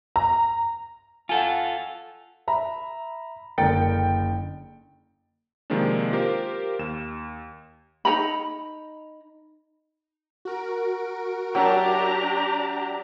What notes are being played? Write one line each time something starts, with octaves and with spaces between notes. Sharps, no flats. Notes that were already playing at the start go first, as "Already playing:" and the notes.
A#5
F4 A4 F#5 G#5
E5 A#5 B5
F#1 D3 A#4 G5 A6 C#7
C3 D#3 F3 G#3 A#3 D4
F4 G4 A#4 C5
D#2 E7
D#4 A#4 A#5 B5
F#4 A#4 D7
F#3 D4 G4 E5 A#5